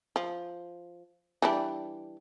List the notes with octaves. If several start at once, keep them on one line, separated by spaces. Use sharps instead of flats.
F3
E3 G3 D4